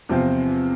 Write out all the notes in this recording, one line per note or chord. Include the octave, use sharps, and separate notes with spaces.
E2 C3 F3 C4 F4